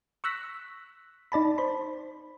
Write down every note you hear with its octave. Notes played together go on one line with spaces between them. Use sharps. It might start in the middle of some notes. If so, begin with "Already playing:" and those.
C#6 E6 F#6 A#6 B6
D#4 D5 A5 B5
C5 B5